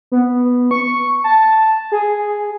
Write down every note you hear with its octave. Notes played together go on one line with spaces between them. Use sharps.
B3
C#6
A5
G#4